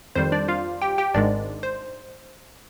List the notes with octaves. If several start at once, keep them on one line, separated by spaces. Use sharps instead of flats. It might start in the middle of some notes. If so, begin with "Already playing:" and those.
F2 D#3 G3 C5
D4 D5
F4 F5
G4 G5
G4 G5
G#1 G#2 D#3 G#3 D4 D5
C5